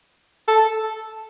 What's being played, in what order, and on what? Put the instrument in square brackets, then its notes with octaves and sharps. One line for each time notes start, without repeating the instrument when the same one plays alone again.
[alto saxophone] A4